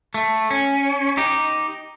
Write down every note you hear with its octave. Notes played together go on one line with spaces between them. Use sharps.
A3
C#4
D#4 G4